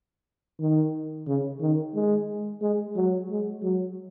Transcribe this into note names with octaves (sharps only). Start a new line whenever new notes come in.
D#3
C#3
D#3
G#3
G#3
F#3
G#3
F#3